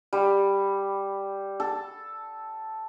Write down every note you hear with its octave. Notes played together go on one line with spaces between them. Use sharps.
G3
A4